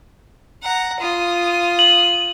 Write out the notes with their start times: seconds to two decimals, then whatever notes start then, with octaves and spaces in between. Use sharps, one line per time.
0.63 F#5 A#5
1.00 F4 D#6
1.79 F#7